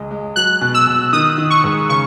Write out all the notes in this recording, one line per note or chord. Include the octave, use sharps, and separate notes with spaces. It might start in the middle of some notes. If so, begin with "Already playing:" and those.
Already playing: C#2 G#3
G#3
F#3 F#6
B2
E6
B2
D#3 D#6
D#3
C#6
G#2
C#3 C#6